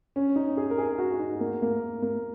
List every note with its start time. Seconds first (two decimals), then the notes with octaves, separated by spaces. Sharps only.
0.16 C#4
0.36 D#4
0.57 G#4
0.70 A#4
0.78 G#4
0.98 F#4
1.20 D#4
1.40 A#3
1.62 A#3
2.02 A#3